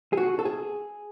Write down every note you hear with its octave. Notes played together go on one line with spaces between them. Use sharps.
G#4
F#4
A4
G#4